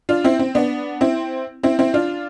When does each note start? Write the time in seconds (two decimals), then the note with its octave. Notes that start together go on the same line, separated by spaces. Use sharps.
0.09 D4 F4
0.24 C4 E4
0.39 C4
0.55 B3 D4
1.01 C4 E4
1.63 C4 E4
1.79 C4 E4
1.94 D4 F4